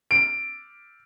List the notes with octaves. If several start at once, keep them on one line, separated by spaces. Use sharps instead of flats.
D7